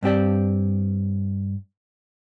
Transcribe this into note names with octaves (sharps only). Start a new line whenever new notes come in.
G2 C4 G4 D5